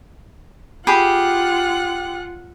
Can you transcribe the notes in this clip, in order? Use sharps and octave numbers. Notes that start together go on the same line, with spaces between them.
F4 G4 G#4 F#5 B5